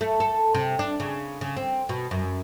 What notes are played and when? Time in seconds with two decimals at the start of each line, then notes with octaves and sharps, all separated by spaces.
0.01 A3
0.20 A4
0.55 C3
0.79 D4
1.00 C#3
1.41 C#3
1.56 C4
1.89 B2
2.11 F#2